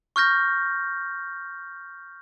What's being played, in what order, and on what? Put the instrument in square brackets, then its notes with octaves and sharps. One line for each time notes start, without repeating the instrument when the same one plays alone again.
[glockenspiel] C#6 F6 G6 A#6